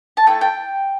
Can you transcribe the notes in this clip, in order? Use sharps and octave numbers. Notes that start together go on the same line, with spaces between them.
A5
A3 E4 A4 G5
G5